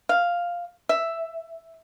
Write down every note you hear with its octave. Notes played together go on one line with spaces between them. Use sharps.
F5
E5